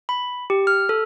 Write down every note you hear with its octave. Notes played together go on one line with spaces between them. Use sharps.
B5
G4
F6
A4